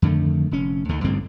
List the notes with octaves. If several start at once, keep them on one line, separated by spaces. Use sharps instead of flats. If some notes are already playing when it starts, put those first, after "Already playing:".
F2 D3 D#3 A3
F1 C#4
D2 D3 D#3
A1 G2 D3 C4